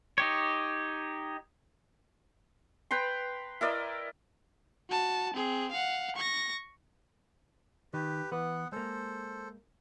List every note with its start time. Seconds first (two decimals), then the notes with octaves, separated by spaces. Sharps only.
0.18 D#4 G4 C#5
2.91 B4 G5 A#5 C6
3.61 E4 A#4 D5 D#5
4.89 F#4 A5
5.34 C4 G#4
5.72 F5 F#5
6.16 C#6 A#6
7.93 D#3 G4 B4
8.32 E3 B3 B4 F#5
8.72 G#3 A#3 A4 C5